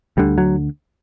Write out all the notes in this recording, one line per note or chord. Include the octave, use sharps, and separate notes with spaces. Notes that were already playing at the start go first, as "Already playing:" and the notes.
D2 D3 G3
F#3